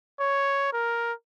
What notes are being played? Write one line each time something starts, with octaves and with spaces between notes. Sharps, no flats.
C#5
A#4